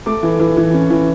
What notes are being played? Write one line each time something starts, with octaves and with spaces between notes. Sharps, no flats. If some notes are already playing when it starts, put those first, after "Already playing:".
A3 D6
E3
E3
E3
C#4
E3